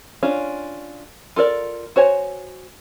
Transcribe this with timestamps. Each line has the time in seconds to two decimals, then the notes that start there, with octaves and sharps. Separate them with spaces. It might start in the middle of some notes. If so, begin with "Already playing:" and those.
0.23 C#4 D4 F4
1.36 F4 A4 A#4 D5
1.96 F#4 C5 C#5 G#5